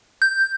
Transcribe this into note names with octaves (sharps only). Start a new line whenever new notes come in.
G6